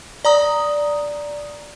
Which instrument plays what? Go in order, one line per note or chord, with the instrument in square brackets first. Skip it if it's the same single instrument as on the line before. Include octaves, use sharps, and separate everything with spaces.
[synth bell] D5 A#5 D#6